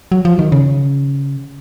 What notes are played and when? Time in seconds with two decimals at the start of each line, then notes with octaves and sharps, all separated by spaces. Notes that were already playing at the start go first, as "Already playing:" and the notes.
0.12 F#3
0.25 F3
0.39 D#3
0.52 C#3